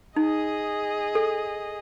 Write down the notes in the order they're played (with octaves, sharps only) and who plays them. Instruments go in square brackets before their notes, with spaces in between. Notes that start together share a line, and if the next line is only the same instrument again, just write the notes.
[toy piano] D#4 [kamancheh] G#4 D#5
[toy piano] A4